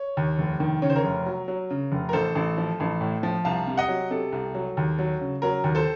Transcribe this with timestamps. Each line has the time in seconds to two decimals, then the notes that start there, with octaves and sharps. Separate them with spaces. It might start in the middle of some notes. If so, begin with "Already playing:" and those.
Already playing: C#5
0.17 D#2
0.38 F1
0.60 D#3
0.82 C#3 C#5
0.90 C5
0.96 A#4 C#5
1.04 F1
1.26 F#3
1.48 F#3
1.70 C#3
1.92 F1
2.09 A#4
2.13 A1 A4 C5
2.35 A1
2.58 F3
2.80 A1
3.01 A2
3.23 F3
3.45 C2 F5 A5
3.67 C3
3.77 D#5 F#5
3.88 F#3
4.11 C3 A4
4.32 C2
4.55 F#3
4.77 D#2
4.99 F#3
5.21 C#3
5.42 F#3 A#4
5.64 D#2
5.75 A4 C5